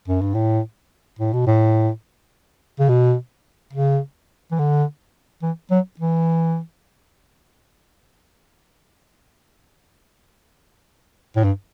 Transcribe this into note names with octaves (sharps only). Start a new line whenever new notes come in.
F#2
G2
A2
A2
B2
A2
C#3
B2
C#3
E3
D3
E3
F#3
E3
A2
G2